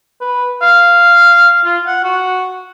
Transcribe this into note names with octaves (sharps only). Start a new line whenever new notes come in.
B4
F5
F4
F#5
F#4